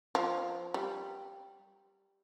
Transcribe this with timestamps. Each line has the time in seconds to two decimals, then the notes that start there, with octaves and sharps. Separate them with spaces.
0.15 F3
0.74 G3